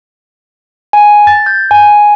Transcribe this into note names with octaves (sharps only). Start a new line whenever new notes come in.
G#5
A6
G6
G#5